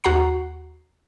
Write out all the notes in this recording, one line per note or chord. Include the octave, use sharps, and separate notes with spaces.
D#2 F#4 F#5 A#5 C7